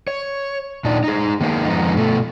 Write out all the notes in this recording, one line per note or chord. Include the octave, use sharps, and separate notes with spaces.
C#5
A#2 D4 D#4
D#4 G#4
D#3 A#3 B3 D#4 G#4 A#4
F2 D#3 G#3 B3 D#4
B2 A3